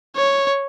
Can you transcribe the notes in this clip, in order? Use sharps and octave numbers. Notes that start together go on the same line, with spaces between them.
C#5